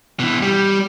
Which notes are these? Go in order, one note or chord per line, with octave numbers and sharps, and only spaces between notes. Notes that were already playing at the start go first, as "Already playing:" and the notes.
B2 E3
G3